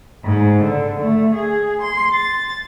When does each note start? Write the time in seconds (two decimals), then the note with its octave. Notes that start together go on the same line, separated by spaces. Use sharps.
0.25 G#2
0.63 D3
1.00 A3
1.34 G#4
1.82 C6
2.14 A6